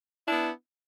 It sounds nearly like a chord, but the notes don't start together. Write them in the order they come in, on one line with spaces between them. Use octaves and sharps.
E4 D4 B3